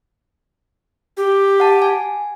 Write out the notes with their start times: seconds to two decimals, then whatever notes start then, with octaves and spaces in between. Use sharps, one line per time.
1.17 G4
1.60 F#5 A5
1.82 G#5